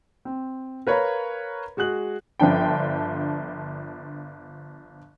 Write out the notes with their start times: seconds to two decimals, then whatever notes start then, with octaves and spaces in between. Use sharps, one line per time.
0.25 C4
0.87 A#4 B4 C#5 F5 A#5 B5
1.77 G#3 F#4 G#4 F#6 F#7
2.40 G1 F3 D4 G5